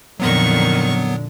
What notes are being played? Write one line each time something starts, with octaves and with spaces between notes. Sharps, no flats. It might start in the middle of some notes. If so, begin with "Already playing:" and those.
F2 A#2 D3 D#3 F#3 B3 C#6